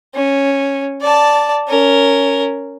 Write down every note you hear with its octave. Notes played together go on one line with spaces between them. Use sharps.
C#4
D5 A5
C#4 A#4